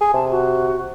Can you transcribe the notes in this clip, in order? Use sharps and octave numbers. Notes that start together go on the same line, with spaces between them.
G#4
C3 A5
F#4